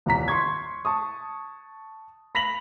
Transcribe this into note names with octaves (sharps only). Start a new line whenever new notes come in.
D#1 C2 A#5 B6
C6 C#6 G#6
A5 C#6 D#6
B5 A#6 B6 F7 F#7